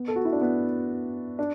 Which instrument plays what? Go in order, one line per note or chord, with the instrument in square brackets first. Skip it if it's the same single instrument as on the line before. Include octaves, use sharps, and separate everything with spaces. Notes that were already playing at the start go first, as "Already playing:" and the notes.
Already playing: [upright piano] B3
A4
F#4
E4
D4
B3
D4